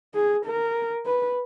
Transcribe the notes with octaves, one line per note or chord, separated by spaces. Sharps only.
G#4
A#4
B4